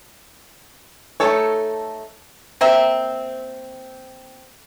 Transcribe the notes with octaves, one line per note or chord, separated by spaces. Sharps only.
A3 D#4 A4 C#5
A#3 C4 E5